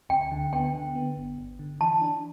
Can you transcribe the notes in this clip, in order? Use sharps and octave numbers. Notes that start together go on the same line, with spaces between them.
D2 G5
D3
B3 G5
D3
B3
G1
G1
D3
E3 A5
D4